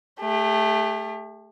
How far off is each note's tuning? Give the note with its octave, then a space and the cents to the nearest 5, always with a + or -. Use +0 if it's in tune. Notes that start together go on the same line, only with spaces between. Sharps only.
A3 -5 G4 +40